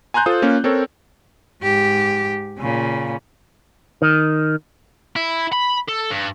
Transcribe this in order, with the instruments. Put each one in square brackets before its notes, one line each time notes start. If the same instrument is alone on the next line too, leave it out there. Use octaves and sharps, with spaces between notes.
[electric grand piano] G#5 A#5 C6 F#6 G6
F4 A4 C5 D#6
A#3 C#4 F4
C4 A4 A#4 C#5
[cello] G#2 G4
A#2 C#3
[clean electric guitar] D#3
[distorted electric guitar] E4
B5
A4
G2